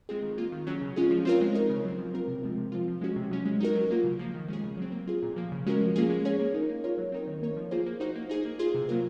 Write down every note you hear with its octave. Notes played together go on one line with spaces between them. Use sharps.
G#3 C4 F4 G#4
D#3
A#3 F4
D#3
F#3 C#4
C#3
G#3 C#4 F4 G#4
F3
C4 F4 A#4 C#5
G#3
D#4 A#4 C#5
C#3
F#3 C4
F3
C4 F4 A#4
C3
F3 G#3 C4
C3
F3 C4 F4
F3
G#3 C#4 F#4
C3
F#3 C#4
G#3
D#4 F#4 A#4
F#3
A#3 F4
C#3
F3 A#3
D#3
G#3 C#4 G#4
C#3
F#3 C4
A#3
F4 G#4
A#2
F3 A#3
C#3
G#3 C#4 F#4 A#4
F3
A#3 C#4 F4 G#4
G#3
C#4 G#4 C#5
A#3
D#4 A#4
A#3
F4 A#4 C#5
F#3
C4 D#4 A#4 C#5
D#3
A#3 D#4 A#4 C#5
F3
A#3 F4 G#4 C5
A#3
D#4 F#4 C5
A#3
D#4 G#4
A#3
F4 G#4 C5
C3
F#3 A#3 F4 A#4